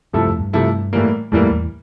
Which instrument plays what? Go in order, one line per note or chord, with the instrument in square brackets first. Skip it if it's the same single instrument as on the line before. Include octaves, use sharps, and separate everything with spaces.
[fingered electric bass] G2 [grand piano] C3 F3 A3 E4 A4
[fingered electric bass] F2
G2
[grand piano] C3 F3 A3 E4 A4
A2 E3 G3 A#3
[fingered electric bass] F2 [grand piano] A2 E3 G3 A#3
[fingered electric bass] E2